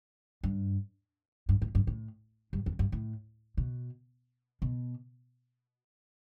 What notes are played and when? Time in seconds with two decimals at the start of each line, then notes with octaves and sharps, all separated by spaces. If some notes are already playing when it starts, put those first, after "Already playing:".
0.43 G2
1.49 G2
1.62 A2
1.75 G2
1.87 A2
2.53 G2
2.66 E2
2.79 G2
2.92 A2
3.57 B2
4.62 B2